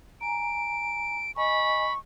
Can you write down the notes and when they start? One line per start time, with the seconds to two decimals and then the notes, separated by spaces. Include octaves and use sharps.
0.21 G#5 A#5 D7
1.36 D#5 G#5 B5 C#6